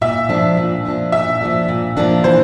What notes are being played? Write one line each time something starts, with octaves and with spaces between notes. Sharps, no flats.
A#2 E5
F3 A#3 D4
A#2
F3 A#3 D4
A#2 E5
F3 A#3 D4
A#2
F3 A#3 D4
E3 C5